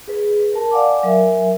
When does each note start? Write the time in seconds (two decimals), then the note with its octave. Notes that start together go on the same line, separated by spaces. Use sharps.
0.08 G#4 B4
0.54 A#4 A5
0.71 D5 F5 F#5 G#5 D6
1.03 F#3 A#4 E5 G#5